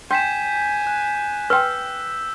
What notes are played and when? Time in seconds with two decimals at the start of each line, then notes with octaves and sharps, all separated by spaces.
0.11 G5 G#5 G6 B6 E7
0.87 F#6
1.50 B4 G5 E6